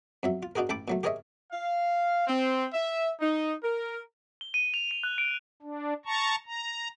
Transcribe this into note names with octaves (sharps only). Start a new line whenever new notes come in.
F2 F#3 E5
F4
D4 D#4 F#4 G#4 A#4
A1 A4 G5 A5 B5 D6
A#2 F#3 A3
G4 G#4 A#4 C#5 D#5 E5
F5
C4
E5
D#4
A#4
G7
D#7
F7
D#7
F#6
D7
D4
A5 A#5 C#6
A#5